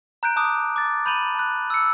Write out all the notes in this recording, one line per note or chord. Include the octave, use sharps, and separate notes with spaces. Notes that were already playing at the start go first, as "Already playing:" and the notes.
A#5 F#6 G6 D7
A5 D6 D#6 F#6
D6 A6
B5 G6 D#7 F7 F#7
A5 F#6
E6 C#7